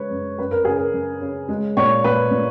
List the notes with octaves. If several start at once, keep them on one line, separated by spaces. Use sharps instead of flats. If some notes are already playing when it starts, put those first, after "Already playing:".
Already playing: C#3 G#3 B4 C#5
F#2
F#2 B4
A#4
C#3 G#4
A#4
F#2
C#3
G#3
A#2 C#5
A#2 B4
A#2